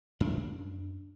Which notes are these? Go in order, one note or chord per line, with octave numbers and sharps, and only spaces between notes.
F#2 D4